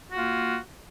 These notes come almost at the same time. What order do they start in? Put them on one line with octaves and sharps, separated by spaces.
F#4 A#3 F4